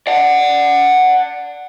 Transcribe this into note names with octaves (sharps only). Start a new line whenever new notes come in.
D5 F#5